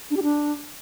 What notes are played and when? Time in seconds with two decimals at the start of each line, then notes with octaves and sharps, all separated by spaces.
0.11 D4
0.17 G4
0.23 D4